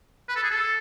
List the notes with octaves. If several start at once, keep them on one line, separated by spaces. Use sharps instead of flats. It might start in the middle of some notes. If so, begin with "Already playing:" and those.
B4
A4
G#4
A4